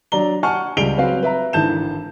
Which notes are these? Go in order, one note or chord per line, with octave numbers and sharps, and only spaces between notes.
F#3 D4 D5 A#5 G7
F#5 G#5 A5 C#6 F6
C#2 G3 G#3 D7 F7 G7
F#3 C4 B4 F5
B4 E5 A#5
G#1 D3 E3 A5 G6 E7